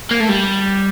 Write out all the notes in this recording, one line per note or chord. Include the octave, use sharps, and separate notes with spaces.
A#3
A3
G3